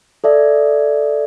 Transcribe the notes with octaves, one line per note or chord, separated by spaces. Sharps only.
A4 D5 E5